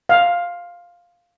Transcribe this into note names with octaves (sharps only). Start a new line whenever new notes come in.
F5